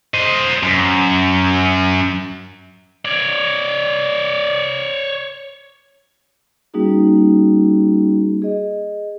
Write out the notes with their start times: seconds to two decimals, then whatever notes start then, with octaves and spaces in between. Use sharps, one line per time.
0.14 C5 D#5
0.63 F#2
3.05 C#5 D5
6.74 G3 A#3 C#4 D#4 F#4 G#4
8.42 G#4 D#5